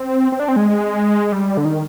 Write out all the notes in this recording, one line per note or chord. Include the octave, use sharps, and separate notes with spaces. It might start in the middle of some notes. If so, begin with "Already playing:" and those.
Already playing: C4
C4
D4
C4
G#3
G3
D3
D#3